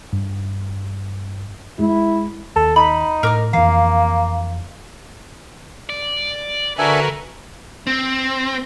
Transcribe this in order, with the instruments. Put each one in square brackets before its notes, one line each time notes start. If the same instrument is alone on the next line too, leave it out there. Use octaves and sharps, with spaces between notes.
[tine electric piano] G2
[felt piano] G#3 [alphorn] E4
[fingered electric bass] D#2 [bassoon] A4
[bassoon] D#4 [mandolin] B5
[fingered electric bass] A2 [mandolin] A#4 D6 F6
[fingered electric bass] F2 E3 [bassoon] A#3 [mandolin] F5
[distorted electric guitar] D5
[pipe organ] D3 [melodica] D4 E5 G#5 [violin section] F#4 A#4 B4
[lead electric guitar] C4